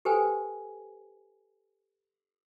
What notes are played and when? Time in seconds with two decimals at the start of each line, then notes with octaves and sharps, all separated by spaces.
0.05 G4 A4 B4 C5 G5 G#5